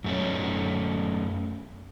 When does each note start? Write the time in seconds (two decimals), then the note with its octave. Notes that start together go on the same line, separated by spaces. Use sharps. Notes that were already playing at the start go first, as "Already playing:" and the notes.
0.04 F#2 A3 C#4